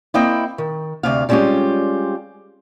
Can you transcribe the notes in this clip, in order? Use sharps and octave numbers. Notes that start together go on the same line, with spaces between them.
A#3 C4 E4 D#5 G5
D#3
D2 C3 F5
G3 G#3 C4 C#4 F4 G4